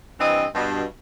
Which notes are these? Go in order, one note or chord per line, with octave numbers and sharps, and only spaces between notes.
G2 E3 C4 D#5
G2 B2